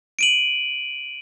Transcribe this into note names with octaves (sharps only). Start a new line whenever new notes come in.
D7 D#7 F#7